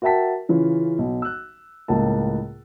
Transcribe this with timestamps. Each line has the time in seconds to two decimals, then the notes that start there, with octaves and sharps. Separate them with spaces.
0.02 F#4 A#4 E5 G5 A5 B6
0.49 C#3 E3 C#4 F4
0.99 B1
1.22 E6 F#6
1.88 C#2 A2 A#3 A5